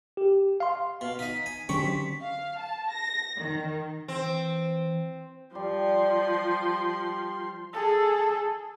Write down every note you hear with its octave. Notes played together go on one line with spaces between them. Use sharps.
G4
F5 C6
B2 F5
D#4 D#5 B6
G#5
D3 F#3 C4 C#4 G4 C#6
F5
A5
A#6
D#3
E3 C4
F3 G3 C6
G#4 A4